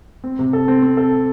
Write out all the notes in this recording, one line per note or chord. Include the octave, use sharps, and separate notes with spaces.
C4
C3
A4
C4
C4
A4